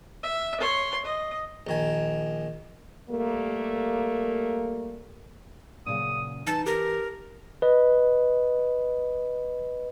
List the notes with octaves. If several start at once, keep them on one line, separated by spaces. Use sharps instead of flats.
E5
C#5 C6
D#5
A#1 D#3 G#5
G3 A3 A#3
A#2 C#3 F#3 D#6
E3 D#4 A5 A#5
G4 A#4
B4 D#5